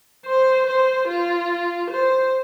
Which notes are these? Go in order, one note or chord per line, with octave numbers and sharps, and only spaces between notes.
C5
C5
F4
C5